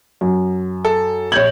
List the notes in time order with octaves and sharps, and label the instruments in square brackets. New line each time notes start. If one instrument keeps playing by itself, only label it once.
[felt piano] F#2
[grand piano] A4
[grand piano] A#1 F#7 [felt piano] C#5 G6 G#6